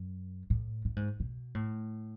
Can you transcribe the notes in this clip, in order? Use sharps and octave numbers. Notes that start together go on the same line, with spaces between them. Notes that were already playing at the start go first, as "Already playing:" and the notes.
Already playing: F#2
A2
A2
G#2
B2
A2